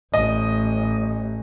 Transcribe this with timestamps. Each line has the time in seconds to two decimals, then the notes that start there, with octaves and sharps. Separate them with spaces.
0.14 A1 D#5